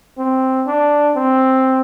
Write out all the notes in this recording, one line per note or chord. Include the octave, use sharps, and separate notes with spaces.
C4
D4
C4